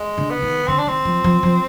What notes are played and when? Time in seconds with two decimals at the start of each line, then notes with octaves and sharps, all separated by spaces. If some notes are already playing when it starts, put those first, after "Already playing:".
Already playing: G#3
0.18 D3
0.30 B3
0.42 D#3
0.68 D3 C4
0.78 D4
0.87 D#3 C4
1.05 F3
1.24 F3
1.43 F3